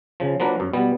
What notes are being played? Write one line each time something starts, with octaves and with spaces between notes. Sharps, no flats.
C#3 F3
F3 F#3 A#3 D4 B4
F#2
B2 G3 B3